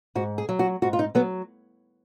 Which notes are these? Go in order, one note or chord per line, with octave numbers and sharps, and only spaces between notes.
G#2 F#4
G#4
F#3
F#4
G#2 F#4
F4
D#4
F#3 B3